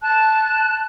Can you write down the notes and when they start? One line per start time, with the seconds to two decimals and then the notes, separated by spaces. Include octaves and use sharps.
0.03 A5 F#6